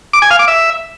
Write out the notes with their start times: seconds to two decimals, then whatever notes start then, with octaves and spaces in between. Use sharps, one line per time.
0.13 D6
0.22 G#5
0.31 F5
0.39 D6
0.48 E5